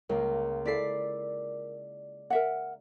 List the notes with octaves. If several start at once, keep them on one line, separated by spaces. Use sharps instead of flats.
C#2 A#3 A#4
E4 A4 D5 B6 C7
A#4 E5 F#5